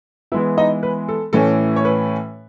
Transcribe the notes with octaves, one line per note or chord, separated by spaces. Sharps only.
E3 G#3 B3 E4 E5
D#4 D#5
B4
A4
A2 E3 A3 C#4 A4
C#5
B4